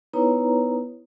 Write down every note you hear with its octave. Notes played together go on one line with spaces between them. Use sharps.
B3 D#4 E4 B4 C#5 A#5